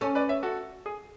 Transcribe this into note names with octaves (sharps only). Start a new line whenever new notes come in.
C#4 A4 C#5
B4 D5
C#5 E5
F#4 A4
G#4